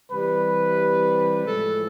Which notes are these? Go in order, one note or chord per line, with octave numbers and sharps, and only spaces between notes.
C3 E3 G3 B4
A2 F3 G#3 A4